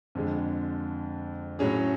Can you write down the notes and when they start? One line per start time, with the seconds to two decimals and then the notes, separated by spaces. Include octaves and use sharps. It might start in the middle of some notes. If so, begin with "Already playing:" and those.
0.15 F2 D3 G#3
1.59 A2 F#3 C#4 G#4